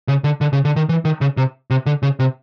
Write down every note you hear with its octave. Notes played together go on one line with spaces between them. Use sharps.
C#3
D3
D3
C#3
D3
D#3
E3
D#3
C#3
C3
C3
D3
C#3
C3